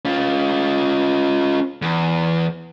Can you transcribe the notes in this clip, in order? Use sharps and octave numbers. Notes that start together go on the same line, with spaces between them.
C#4 F4
E2